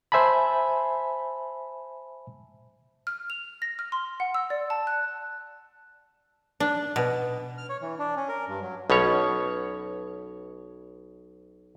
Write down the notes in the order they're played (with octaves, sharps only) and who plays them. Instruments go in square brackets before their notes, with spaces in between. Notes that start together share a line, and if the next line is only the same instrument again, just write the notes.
[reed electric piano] C5 E5 G#5 A5 B5
[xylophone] F6
F7
A#6
F6
C6
F#5
E6
D5
A5
F#6
[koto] D4
B2
[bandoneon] F6
C#5
E3
D4
C#4
A#4
G2
F#3
[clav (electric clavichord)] B1 B2 C#4 C#5